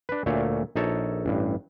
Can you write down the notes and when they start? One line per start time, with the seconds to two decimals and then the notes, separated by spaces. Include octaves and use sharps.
0.09 D4 B4
0.26 D2 A#2 A3 C#5
0.76 A#1 D#4 A4 C#5 A5
1.26 A1 G2